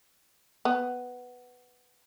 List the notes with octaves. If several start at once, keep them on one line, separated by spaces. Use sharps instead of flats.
B3